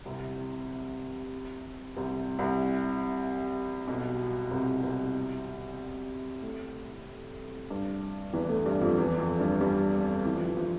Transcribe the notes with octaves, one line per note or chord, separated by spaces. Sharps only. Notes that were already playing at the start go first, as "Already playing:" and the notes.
C2 C3
C2 C3
C2 C3
B1 B2
C2 C3
C2 C3
A2
G2
E2 E3
A2 A3
G2 G3
F2 F3
E2 E3
F2 F3
G2 G3
G2 G3
E3
F3
E3
F3